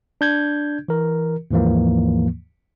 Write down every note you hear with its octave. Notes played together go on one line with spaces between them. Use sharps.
D4 G6 G#6
E3 A#4
D#2 G#2 E3 F3 A#3